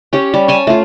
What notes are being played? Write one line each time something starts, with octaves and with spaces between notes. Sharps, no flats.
C#4 G4 C#5
G3
C#5 G#5 A5
A3 F4